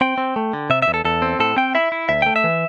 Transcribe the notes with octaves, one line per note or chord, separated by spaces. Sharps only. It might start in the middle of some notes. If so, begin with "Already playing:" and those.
C4 G5
C4
A3
D3
C3 E5
E5
E2
A4
E2 A4
C4
A2 A4
C4 G5
E4 E5
E4
D2 E5
A3 G5
E5
E3